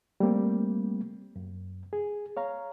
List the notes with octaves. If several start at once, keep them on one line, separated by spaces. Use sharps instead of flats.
G3 A3 A#3 C4
F#2
G#4
C#5 F5 A#5